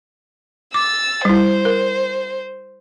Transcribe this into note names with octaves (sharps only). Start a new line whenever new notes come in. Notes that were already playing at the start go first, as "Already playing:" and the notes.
D6 E6 A6
G3 E4 C5
A#4